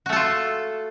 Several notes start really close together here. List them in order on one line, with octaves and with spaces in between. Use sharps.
F#4 A3 A4 F4